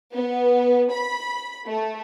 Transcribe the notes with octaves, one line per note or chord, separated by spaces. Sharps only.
B3
B5
A3